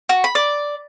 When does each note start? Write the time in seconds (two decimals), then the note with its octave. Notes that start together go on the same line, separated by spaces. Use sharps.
0.09 F#4
0.24 B5
0.35 D5